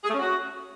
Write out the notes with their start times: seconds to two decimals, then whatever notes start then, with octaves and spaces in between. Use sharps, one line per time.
0.03 G#4
0.09 A3
0.14 C#4
0.20 F#4